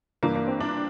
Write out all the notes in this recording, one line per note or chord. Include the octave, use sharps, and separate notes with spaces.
G2 E3 A#3
A#3
C4
D4